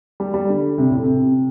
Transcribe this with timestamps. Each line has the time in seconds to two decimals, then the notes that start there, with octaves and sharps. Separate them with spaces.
0.20 G3
0.34 G3
0.49 D3
0.78 C3
0.90 A2
1.03 C3